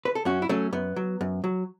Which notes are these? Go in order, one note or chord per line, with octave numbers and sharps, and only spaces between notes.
B4
A4
F#2 C#4 F#4
E4
F#3 A3 C#4
F#2 B3
F#3
F#2
F#3